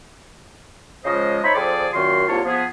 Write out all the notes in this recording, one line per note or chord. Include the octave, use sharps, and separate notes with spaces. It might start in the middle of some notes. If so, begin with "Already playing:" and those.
C#3 F3 G#3 C5 D#5
D#4 C5 C#5 E5 B5
F3 C4 G#4 A4 D5
F#2 A#2 D#3 F#4 C6
C2 F#3 A#3 F4 C#5 A5
F3 B3 G#4